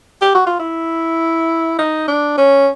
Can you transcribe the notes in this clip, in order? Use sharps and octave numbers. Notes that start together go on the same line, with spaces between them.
G4
F#4
F4
E4
D#4
D4
C#4